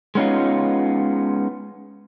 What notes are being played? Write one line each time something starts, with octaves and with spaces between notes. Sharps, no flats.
G#3 B3 C#4 D#4 F4